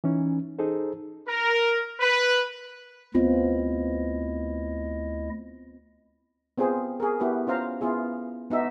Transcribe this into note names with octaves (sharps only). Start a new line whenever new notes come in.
E3 C#4 D#4
D#4 G#4 A4 C5
A#4
B4
D2 B3 C4 E4 F4 D#5
B3 C4 F4 G#4 C5
G#4 A#4
B3 E4 F#4 G4 B4
C#4 F4 C5 F5 A#5
B3 E4 F4 G#4
B3 D#4 F#4 E5